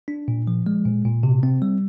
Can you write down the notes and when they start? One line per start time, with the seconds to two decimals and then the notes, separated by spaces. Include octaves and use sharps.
0.08 D4
0.28 A#2
0.47 F3
0.66 G#3
0.85 A#2
1.05 A#2
1.23 C3
1.43 C4
1.62 G3